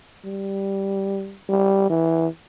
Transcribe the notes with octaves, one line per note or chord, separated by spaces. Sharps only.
G3
G3
E3